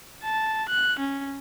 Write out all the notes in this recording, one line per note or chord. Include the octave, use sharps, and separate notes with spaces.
A5
F#6
C#4